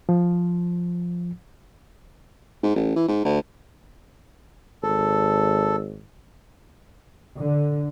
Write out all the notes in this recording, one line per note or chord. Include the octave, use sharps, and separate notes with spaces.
F3
G#2
A1
E3
G#2
D2
G#1 A4
D3